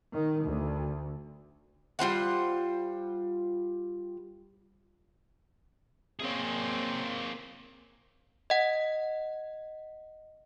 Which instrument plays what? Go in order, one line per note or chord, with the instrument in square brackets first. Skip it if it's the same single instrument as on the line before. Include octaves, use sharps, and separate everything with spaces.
[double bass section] D#3
D2
[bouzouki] G3 F4 C5 F#5
[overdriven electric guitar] A#3 G#4 [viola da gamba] C4 C#5
[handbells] D#5 F#5